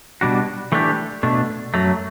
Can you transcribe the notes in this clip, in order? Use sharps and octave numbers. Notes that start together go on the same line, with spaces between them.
B2 G3 D4 F#4
E3 A3 D4 G4
B2 A3 D4
F#2 F#3 A3